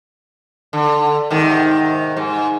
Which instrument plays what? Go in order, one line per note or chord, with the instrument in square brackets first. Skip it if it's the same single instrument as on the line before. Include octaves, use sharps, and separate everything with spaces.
[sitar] D3
G#2 C3 D#3
G#2